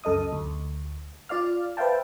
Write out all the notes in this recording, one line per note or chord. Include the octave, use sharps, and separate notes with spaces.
C#2 F#2 A4 D#5 D#6
D2
F4 D5 F5 F6
B4 C5 E5 F5 G5 A5